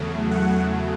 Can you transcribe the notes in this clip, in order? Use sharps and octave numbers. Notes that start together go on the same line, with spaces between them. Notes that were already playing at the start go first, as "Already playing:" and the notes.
Already playing: E2 C#3 F#3 A3
F#5